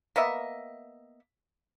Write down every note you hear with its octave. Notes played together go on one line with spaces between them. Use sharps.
A#3 B3 D#5 E5